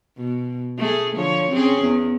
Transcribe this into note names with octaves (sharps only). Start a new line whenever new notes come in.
B2
A3 G#4
D3 F3 C#5
C4 C#4 G#4
E2